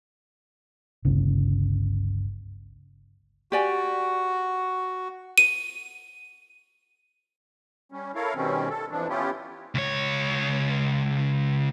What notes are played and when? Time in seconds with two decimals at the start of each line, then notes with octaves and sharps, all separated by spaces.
1.05 G1 C#2 C#3
3.52 F#4 G4 D5 G#5
5.38 D#7
7.92 G3 C#4
8.15 E4 A4 A#4 C#5 F5
8.35 B2 D#3 G3 C4 C#4
8.70 A4
8.91 F2 E3 F3 D4
9.09 B3 C#4 E4 F4 G4
9.75 C#2 C#5